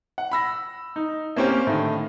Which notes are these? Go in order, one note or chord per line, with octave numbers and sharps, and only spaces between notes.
F#5
B5 E6 A#6
D#4
A#3 C4 C#4 G4 C5 F5
A2 D3 D#3